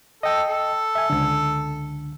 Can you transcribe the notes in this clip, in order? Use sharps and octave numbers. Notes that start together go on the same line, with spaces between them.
A4 D#5 G5
A4
E5 G#5
C#2 D3